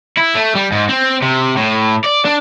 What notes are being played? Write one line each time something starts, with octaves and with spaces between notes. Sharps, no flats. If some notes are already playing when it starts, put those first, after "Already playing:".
E4
A3
G3
G#2
C4
C3
A2
D5
D4